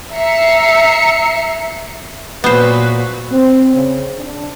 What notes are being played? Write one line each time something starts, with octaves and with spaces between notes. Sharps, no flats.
E5 A#5 C7 C#7
A#2 F#3 B3 B4 C5
C4
C#3
D4